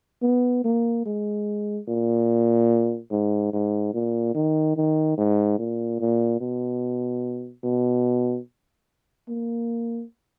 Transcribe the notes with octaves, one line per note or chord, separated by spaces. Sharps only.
B3
A#3
G#3
A#2
G#2
G#2
A#2
D#3
D#3
G#2
A#2
A#2
B2
B2
A#3